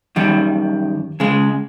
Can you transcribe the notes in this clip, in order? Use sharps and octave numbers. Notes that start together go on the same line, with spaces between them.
F#2 D#3 G3
C#3 G#3